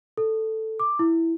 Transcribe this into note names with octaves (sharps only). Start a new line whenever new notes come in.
A4
D6
E4